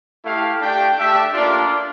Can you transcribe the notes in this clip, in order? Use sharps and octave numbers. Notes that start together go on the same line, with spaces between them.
A3 E4 G4 F5
A3 D4 G4 G5
A3 D4 G4 E5
A#3 D4 F4 D5